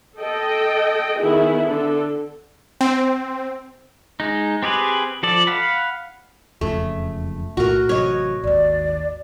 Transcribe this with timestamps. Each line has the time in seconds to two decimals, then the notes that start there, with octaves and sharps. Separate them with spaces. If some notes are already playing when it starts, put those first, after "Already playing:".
0.18 A4 D#5 G5
1.19 D#3 B3 E4 G#4
1.64 D3 A4
2.81 C4
4.20 G#3 D#4
4.63 C4 G4 G#4 B4
5.23 F3 A4 D5
5.47 F5 F#5 B5
6.61 E1 F2 C#3 A3
7.57 B1 A2 A3 F#4 A#4
7.89 A1 C3 F#3 C#5 D#5
8.44 G#1 D#2 D5